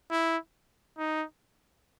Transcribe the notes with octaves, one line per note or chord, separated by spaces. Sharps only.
E4
D#4